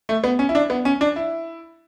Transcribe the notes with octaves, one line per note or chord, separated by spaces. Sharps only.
A3
B3
C#4
E4
D4
B3
C#4
D4
E4